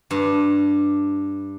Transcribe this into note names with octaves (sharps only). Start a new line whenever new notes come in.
G2